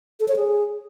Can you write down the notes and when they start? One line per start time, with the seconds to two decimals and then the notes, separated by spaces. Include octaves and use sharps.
0.20 A4
0.28 C#5
0.36 G#4